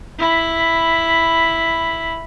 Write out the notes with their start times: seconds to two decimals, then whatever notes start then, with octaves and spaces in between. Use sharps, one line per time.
0.19 E4 B5